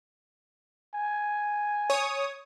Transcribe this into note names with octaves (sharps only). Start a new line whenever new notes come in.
G#5
C#5 D#6